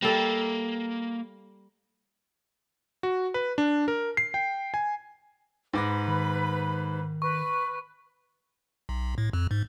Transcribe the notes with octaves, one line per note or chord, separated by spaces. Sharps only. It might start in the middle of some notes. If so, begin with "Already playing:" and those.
G3 A#3 A4 E5
F#4
B4
D4
A#4
C7
G5
G#5
G#2 B4 B5 D6 A#6
D#3
B4 C#6
B1
A2
F2
G#2